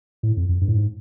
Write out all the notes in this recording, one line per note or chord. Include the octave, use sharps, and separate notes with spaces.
A2
F2
F2
G2
A2
G#2